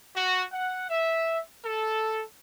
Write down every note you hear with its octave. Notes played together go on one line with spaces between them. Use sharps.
F#4
F#5
E5
A4